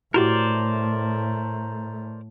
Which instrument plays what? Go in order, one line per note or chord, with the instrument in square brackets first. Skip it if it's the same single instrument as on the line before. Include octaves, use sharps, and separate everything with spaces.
[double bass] A2 A3 [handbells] E4 F#4 G4 [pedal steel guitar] A#4 C5 D5